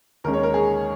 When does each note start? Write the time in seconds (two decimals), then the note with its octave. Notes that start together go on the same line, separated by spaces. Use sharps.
0.24 D#2 D#3 G#3 C#4 A#4
0.34 C#5
0.43 A#4
0.54 G#4